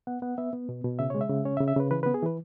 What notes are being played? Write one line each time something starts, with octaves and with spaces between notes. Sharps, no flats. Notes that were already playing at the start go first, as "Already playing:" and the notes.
B3 F#5
B3 F#5
B3 E5
B3
B2
B2
C#3 E5
G#3 C#5
E5
C#3
C#4 C#5
E5
C#3
E5
C#3 B4
E3 B4
B3 B4
G#4
E3 B4